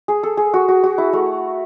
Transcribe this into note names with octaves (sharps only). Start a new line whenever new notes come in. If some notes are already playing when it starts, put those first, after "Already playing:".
G#4
A4
G#4
F#4
F#4
F#4
E4
A3